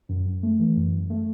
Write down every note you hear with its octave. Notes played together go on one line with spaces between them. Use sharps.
F#2
F#2
A3
E3
F#2
F#2
A3